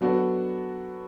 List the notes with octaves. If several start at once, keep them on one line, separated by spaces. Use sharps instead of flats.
F#3 B3 D4 F#4 A4